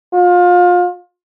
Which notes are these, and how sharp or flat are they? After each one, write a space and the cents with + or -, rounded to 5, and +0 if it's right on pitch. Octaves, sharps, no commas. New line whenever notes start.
F4 +30